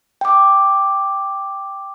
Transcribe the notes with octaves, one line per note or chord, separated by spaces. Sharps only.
G5 D6